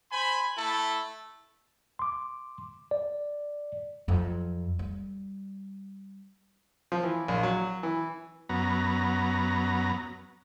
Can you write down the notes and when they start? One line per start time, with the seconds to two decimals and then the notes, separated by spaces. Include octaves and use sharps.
0.11 C5 G#5 B5
0.57 A3 E4 A4
1.99 C6 D6
2.91 D5
4.08 F2 F#3
4.79 G3
6.92 F3
7.03 E3
7.28 A#1
7.43 F#3
7.83 E3
8.49 F#2 B3 A#5